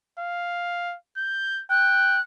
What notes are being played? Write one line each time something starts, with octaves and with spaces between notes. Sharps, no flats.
F5
G6
G5 F#6